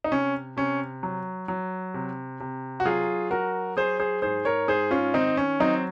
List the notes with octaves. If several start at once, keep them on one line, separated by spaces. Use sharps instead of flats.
D#4
C3 C#4
C3 C#4
F#3
F#3
C3
C3
F#4
F#3 F4 G#4
F#3 F#4 A#4
F#3 G#4 C5
G#4 C5
G#2 G#4 C5
A#4 C#5
G#2 G#4 C5
C#4 F4
D#3 C4 D#4
C#4
F#3 C4 D#4